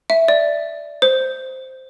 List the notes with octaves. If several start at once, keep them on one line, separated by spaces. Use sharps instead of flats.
E5
D5
C5